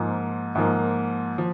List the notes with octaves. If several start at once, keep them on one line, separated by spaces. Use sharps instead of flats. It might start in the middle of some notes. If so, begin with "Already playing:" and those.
Already playing: G#2 F3 A#3
G#2 F3 A#3
F3